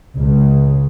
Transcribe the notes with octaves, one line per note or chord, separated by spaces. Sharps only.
C#2 C#3